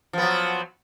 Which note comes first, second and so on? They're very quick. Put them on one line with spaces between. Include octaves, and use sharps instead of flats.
F3 B3 F#3